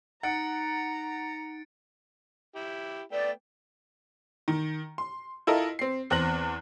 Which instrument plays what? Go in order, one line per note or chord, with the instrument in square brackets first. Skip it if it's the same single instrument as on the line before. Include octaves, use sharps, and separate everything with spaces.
[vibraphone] D#4 [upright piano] F#5 [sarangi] A#5 [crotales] A6 C#7 D7
[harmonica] E4 G4
[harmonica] A3 B3 G5 [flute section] D5
[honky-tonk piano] D#3
C6
E4 F4 A4 A#4 D#5
C4 C7
E2 C4 F#6 A#6 F#7